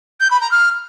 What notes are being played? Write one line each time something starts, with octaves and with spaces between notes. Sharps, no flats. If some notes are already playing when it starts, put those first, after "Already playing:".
G6
B5
A#5
F6